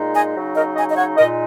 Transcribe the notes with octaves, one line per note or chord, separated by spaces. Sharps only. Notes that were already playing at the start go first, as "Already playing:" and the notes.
Already playing: A#2 G#3 D#4
D#5 G#5
C#3 F#3 D#4
A#4 D#5
D#5 G#5
D#5
C#5 F#5
A#2 G#3 D#4 A#4 D#5